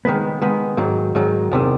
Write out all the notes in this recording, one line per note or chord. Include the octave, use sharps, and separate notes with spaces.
D#3 G#3 B3
D#3 G#3 B3
G#2 D#3 F#3
G#2 D#3 F#3
E2 C3 D#3